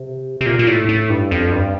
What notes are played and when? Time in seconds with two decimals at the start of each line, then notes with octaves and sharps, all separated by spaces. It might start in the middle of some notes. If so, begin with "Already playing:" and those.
Already playing: C3
0.41 C3
0.46 A#2
0.59 A#2
0.67 A2
0.89 A2
1.10 G2
1.31 F2
1.52 G2